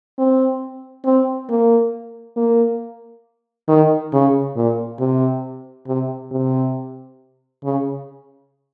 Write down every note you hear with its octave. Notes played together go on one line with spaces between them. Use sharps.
C4
C4
A#3
A#3
D#3
C#3
A#2
C3
C3
C3
C#3